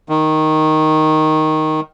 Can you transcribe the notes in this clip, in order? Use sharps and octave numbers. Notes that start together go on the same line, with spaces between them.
D#3